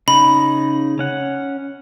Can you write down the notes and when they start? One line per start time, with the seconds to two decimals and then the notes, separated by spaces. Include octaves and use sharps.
0.08 C#3 D#4 B5
0.99 C#4 F#5